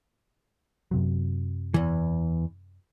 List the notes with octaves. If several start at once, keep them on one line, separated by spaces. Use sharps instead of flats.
F#2 C3 F#3
E2 E3